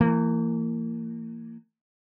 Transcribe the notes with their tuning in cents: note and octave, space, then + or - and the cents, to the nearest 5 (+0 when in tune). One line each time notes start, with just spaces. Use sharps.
E3 +25 A#3 -30